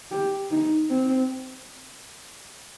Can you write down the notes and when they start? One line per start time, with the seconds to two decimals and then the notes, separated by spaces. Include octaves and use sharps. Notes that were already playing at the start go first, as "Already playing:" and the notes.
0.11 G4
0.51 D#4
0.90 C4